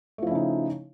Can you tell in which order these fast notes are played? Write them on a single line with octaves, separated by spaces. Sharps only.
A3 F3 E4 C#3 D#4